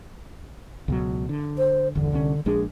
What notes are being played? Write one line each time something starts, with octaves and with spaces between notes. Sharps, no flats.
C#2 B2 F#3
D3
C5
G1 E2 D3
C2 C#4
A#1 G#3 D4 G#4